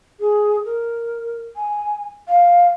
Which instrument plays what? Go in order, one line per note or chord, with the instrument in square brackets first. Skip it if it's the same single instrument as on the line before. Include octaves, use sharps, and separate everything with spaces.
[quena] G#4
A#4
G#5
F5